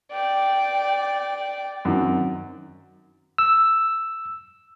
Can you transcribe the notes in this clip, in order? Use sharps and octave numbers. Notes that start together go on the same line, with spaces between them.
D5 G5
F#2 D#3 C4
E6